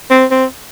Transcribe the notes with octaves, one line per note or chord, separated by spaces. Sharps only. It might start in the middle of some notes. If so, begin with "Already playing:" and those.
C4
C4